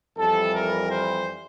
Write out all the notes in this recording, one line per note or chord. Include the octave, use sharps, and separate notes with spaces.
F2 E3 G3 A4
A#4
C5